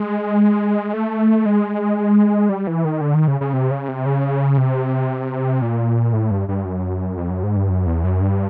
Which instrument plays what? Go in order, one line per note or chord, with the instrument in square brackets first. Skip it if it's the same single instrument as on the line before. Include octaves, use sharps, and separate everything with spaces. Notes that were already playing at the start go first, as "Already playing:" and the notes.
Already playing: [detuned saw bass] G#3
A3
G#3
G3
E3
D#3
D3
D#3
C#3
C#3
C3
C#3
C3
C#3
C3
A#2
A2
G2
G2
F#2
F2
F#2
G#2
G2
F#2
E2
F#2
G2